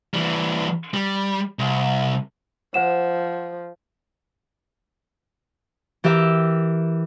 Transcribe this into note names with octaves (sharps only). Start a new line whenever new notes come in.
E3 G3
G3
C2
F3 C5 F#5 E7
E3 G4 A#4 E5